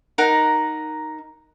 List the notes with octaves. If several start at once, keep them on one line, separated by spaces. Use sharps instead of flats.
D#4 A#4 F#5